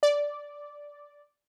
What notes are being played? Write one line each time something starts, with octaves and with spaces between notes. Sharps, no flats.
D5